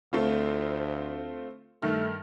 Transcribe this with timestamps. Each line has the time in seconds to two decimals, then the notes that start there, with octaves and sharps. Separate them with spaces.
0.13 D2 A3 C4 F4
1.82 G2 D#3 A3 F6